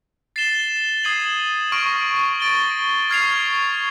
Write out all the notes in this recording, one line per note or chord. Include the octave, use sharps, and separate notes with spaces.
A6 C7 E7 G7
D#6 G#6 C7 D#7 F#7
C#6 F6 A#6 D7 F7
A6 D7 G7
C#6 F6 G#6 C7 F7